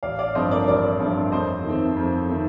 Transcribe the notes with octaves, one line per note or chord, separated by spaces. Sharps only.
A1 D5 F5
D5 F5
G2 F3 A3 C4 C5 D#5
A#4 D5
A1 A#4 D5
G2 F3 A3 C4
F2 C5 D#5
D#3 A3 C4
F2
D#3 A3 C4